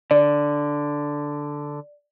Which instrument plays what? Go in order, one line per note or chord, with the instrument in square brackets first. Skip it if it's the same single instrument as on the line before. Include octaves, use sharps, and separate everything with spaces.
[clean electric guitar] D3 [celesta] D5